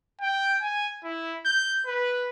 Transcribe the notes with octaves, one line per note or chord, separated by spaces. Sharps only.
G5
G#5
E4
G6
B4